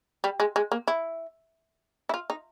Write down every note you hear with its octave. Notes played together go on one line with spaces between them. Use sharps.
G3
G#3
G#3
A#3
E4
E4
F4
D#4